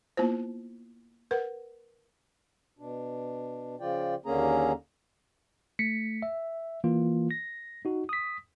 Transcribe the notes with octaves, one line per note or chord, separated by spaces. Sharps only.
A#3 B3 E4 F4 C5
A#4 B4 F#5
B2 D4
C#3 F3 F4 D5 G5
D#2 D3 A#3 C#4 G#4 A#5
A3 B6 C#7
E5
E3 A#3 F4
A#6
D#4 F#4
D#6 B6